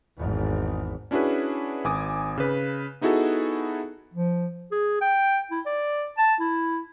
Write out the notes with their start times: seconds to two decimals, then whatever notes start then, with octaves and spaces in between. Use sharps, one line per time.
0.18 G#1 E2
1.11 C#4 D4 E4 F#4 G#4 B4
1.84 G#1 G#5 D6 D#6
2.37 C#3 B4
3.01 B3 D#4 E4 F#4 G#4 A4
4.14 F3
4.72 G#4
5.02 G5
5.51 E4
5.66 D5
6.18 A5
6.40 E4